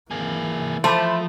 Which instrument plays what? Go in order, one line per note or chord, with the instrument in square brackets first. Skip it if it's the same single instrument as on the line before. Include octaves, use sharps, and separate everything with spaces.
[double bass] E3 [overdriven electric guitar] A#3 G#4
[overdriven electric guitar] F3 [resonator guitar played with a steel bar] A3 [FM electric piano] C5 A5 B5